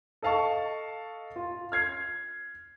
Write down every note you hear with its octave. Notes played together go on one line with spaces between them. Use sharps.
A4 D#5 F5 A5 C#6
F4
F6 G#6 C7